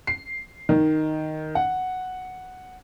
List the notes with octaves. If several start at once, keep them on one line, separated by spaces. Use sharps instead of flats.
C7
D#3
F#5